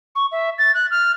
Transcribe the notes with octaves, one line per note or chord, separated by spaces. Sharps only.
C#6
E5
A6
F#6
F6